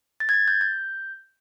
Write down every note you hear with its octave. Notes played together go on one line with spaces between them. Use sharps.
A6
G#6
A6
G6
G6